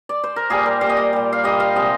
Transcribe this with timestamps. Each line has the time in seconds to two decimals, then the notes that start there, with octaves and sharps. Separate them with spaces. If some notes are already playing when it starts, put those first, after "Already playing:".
0.09 D5
0.24 C5
0.36 A#4
0.50 A#2 G3 G#4
0.66 A#4
0.81 G3 C5
0.86 A#2 D#5
0.97 D5
1.13 A#2 G3
1.33 F5
1.44 A#2 G3 D#5
1.60 F5
1.75 C3 F3 G#3 D#5